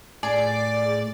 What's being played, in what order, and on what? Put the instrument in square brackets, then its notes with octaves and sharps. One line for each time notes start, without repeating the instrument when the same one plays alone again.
[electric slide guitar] A2 [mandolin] G#4 [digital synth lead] D5